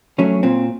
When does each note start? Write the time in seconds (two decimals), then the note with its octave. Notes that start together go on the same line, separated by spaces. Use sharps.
0.19 F#3 A3 C#4
0.43 A#2 C4